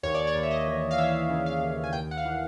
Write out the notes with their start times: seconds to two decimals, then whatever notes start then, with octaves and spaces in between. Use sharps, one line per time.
0.03 D#2 C#5
0.15 D5
0.27 C#5
0.36 D#2
0.43 E5
0.51 D#5
0.67 E3
0.91 F5
0.98 E3 E5
1.30 C#3
1.46 F5
1.61 D#2
1.84 G#5
1.93 D#2 G5
2.11 F#5
2.17 F5
2.25 E3